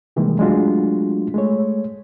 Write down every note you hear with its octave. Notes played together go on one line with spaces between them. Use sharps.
C3 D#3 E3 G3 G#3 A#3
F#3 G#3 A3 D4 F4 F#4
G#3 A3 C#5